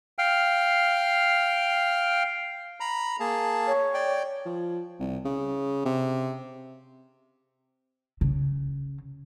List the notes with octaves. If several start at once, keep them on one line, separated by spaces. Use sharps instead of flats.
F5 G5 F6
A#5 B5
A#3 G#4 A5
C#5
D5 G5
F3
C2
C#3
C3
C#3